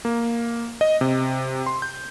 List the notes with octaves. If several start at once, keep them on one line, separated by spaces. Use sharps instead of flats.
A#3
D#5
C3
C6
G6